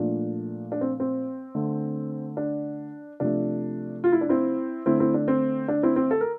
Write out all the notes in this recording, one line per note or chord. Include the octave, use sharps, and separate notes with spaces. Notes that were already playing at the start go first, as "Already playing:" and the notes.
Already playing: A#2 F3 A3 D4
D4
C4
C4
D3 A3
D4
C3 F3 A3 D4
F4
E4
D4
C4 E4
D3 A3 C4 E4
C4 E4
D4
C4
D4
C4 E4
C4
A4
A#4